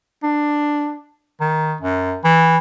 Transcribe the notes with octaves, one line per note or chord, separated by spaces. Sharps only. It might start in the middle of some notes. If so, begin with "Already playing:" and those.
D4
D#3
F#2
E3